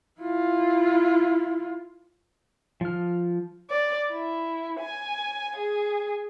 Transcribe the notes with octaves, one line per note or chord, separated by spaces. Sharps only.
E4 F4
F3 F6
D5
E4
G#5
G#4